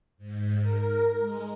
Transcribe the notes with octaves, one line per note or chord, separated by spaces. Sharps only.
G#2
A#4
G#3